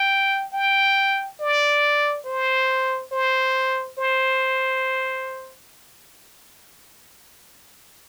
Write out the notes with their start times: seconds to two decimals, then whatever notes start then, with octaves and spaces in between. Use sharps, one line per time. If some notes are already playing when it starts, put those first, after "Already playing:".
Already playing: G5
0.53 G5
1.40 D5
2.26 C5
3.12 C5
3.98 C5